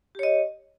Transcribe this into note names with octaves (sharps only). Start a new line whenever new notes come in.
G4 C#5 D#5